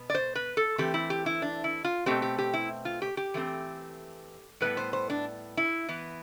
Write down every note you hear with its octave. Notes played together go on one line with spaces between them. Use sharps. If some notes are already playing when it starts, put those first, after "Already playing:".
Already playing: B2 B3
D5
C5
B4
A4
E3 A3 C4 G4
E4
G4
E4
D4
E4
F4
B2 A3 C4 G4
G4
G4
E4
F4
G4
G4
E3 A3 C4
A2 G3 B3 B4
C5
C5
D4
E4
E3 B3